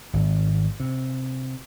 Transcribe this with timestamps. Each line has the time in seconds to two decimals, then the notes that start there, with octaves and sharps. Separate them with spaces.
0.13 G#1
0.80 C3